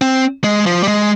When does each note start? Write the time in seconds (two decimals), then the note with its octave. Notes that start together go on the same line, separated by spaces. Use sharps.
0.01 C4
0.44 G#3
0.66 F3
0.83 G3
0.88 G#3